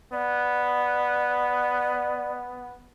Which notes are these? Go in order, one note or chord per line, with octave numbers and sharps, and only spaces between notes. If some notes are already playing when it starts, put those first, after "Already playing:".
B3 D5